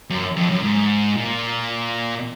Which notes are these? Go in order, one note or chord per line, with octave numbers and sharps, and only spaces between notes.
F#2
F2
F#2
G#2
A#2